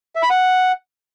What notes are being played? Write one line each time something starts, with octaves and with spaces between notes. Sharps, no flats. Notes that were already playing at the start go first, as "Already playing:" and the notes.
E5
B5
F#5